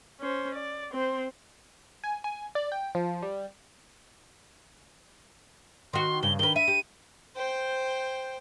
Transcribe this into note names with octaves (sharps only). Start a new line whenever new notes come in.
C#4 C5
D5
C4 C5
G#5
G#5
D5
G5
F3
G3
D#3 F#4 C6
G2 C#3 G7
D#3 B4 G7
E5 D#7
G4
C5 G5